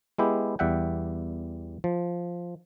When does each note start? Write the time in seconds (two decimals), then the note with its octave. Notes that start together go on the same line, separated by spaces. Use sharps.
0.18 G#3 B3 E4 G4
0.59 E2 G3 E5 F#5 G5
1.84 F3